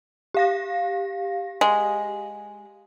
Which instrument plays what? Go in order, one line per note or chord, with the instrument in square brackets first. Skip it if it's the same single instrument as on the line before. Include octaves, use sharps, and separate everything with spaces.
[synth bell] G4 F5 A#6
[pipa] G#3